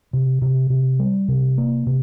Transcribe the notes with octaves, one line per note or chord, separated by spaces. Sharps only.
C3
C3
C3
G3
C3
A#3
C3